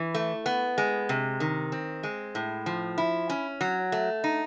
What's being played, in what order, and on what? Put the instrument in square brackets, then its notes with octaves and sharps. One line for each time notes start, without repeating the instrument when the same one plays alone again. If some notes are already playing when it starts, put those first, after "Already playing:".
Already playing: [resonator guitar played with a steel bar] E3
A3
B3
G#3
C3
D#3
C4
G#3
A2
F3
E4
C#4
F#3
A3
D#4